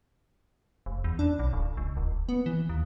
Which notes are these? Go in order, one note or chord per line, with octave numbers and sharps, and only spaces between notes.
F1
E2
D4
B1
D1
C#2
D#1
B3
E3
D#2